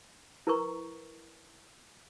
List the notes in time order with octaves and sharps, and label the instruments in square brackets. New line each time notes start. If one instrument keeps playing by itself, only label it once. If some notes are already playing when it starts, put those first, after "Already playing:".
[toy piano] E4 A#4 B4 A#5 C#6